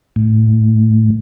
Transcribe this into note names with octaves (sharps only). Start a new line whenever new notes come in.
A2